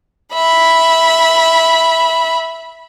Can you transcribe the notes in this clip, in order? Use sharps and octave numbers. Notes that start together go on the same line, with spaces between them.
E5 B5